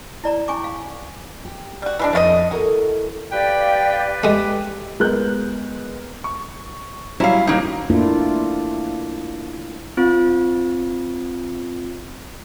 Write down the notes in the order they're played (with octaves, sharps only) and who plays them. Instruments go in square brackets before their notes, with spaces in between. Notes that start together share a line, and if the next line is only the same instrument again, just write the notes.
[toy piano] E4 D5 A#5
C#4 G#5 C#6 D6
F5
[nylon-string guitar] G4
[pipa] G3 F#4
E3 G#3 D4
[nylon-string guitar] F2 [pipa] A3 F4 D#5
[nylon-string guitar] E4 A4 A#4 [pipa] F#4
[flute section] G4 D5 F5 [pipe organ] B4 [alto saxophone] G5
[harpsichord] G#3 A3 [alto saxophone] G4
[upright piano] G#3 B3 A#4 F#6 G6
[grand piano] C#6
[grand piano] F#3 G3 C#4 [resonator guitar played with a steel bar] E4 F5
[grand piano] D#1 [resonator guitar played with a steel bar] A#3 D#4
[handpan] A3 A#3 D4 E4 F4
[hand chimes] C4 F4